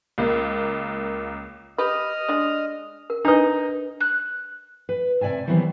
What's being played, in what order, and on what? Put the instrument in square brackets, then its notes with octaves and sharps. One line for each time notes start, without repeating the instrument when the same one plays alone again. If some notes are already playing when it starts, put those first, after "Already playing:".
[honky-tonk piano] C#2 A#3
[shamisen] G4 B4 [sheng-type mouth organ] D#5 D#6 F6
[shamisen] G#3 D4
[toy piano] A#4
[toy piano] D4 B4 [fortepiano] D#4 D#5
[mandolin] F#6
[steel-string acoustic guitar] B4
C3 D5 E5 G#5 A5
D#3 E3 F#3 G3 B3 C4